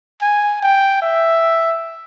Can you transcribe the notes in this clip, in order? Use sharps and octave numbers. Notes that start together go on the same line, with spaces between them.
G#5
G5
E5